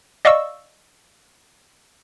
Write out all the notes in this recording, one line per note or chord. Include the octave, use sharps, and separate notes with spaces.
D5 D#5 F5 C#6 E6